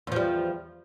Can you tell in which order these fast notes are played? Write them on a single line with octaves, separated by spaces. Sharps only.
E2 F3 G3